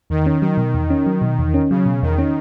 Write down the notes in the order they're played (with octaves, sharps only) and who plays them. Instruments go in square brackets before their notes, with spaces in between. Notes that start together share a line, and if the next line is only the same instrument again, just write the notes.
[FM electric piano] E2 [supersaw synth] D#3
[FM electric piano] C#4
[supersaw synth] D#3 [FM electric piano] F#3
[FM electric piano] B2
E2
C#4
F#3
B2
E2
C#4
[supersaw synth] C#3 [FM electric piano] F#3
[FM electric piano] B2
[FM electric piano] E2 [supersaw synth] D#3
[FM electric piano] C#4